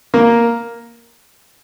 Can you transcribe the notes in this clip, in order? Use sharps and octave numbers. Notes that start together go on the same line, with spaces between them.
A#3